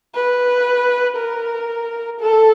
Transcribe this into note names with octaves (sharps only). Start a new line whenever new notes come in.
B4
A#4
A4